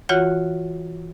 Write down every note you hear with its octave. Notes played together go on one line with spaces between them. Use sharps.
E3 F4 F#4 C#5 F#5 F#6